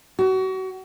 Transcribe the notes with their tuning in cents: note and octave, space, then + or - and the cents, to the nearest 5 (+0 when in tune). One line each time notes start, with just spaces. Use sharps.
F#4 +30